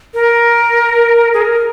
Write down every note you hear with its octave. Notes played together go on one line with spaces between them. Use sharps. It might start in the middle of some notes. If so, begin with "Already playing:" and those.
A#4
G#4
A#4